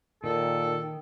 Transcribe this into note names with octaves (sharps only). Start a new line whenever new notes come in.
A#2 D#3 A4